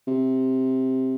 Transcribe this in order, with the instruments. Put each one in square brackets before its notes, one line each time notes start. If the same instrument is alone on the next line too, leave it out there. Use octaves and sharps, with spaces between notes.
[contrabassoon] C3